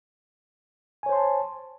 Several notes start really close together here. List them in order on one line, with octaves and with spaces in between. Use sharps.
G#5 C#5 C5 C6 A5